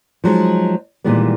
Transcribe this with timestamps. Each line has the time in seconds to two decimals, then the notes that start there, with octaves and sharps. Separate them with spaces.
0.24 F3 F#3 G#3 D#4
1.04 A#2 D#3 E3 G3 G#3 B3